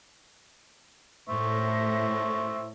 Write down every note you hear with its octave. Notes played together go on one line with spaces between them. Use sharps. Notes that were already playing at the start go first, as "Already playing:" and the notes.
A2 C5 E5 C#6